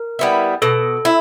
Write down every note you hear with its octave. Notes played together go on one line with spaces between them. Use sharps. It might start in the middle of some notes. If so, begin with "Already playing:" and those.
Already playing: A#4
G3 B3 E4
B2 A4
E4